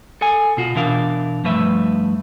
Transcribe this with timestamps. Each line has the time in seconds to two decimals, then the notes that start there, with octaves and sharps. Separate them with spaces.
0.21 A4 G#5
0.57 B2 F4 F#4
0.75 B2 E3 D4 A#4 F5
1.44 G2 F3 A3 B4 E5